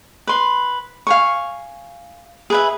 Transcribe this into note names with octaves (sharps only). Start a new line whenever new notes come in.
B4 C6
F5 G#5 C#6
G#4 B4 E5